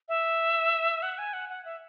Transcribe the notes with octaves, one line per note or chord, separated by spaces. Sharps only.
E5
F#5
G#5
F#5
F#5
E5